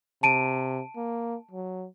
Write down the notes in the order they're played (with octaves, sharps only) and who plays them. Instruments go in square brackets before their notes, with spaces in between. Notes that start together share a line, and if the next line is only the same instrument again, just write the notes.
[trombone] C3 [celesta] A5 D7 D#7
[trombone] A#3
F#3